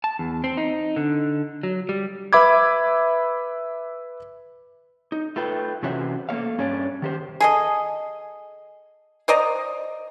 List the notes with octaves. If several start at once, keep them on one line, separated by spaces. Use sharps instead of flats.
A5
E2
C4
D#4
D3
F#3
G3
B4 E5 B5 D6 G#6
D#4
A3 F4 B4 G5
C3 E3 C#4 F#4 C5 E5
A3 A#3 C#5 F5
G2 C#4 D4 C#5 D5
D#3 G4 C5
G#4 A4 D#5
C5 D5 D#5 A#5